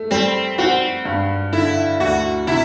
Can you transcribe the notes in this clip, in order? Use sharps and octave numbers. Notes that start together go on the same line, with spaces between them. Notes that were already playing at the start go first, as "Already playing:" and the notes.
Already playing: A3
G3 C4
C4 F#4
G2
D3 E4
D2 F#4
C3 E4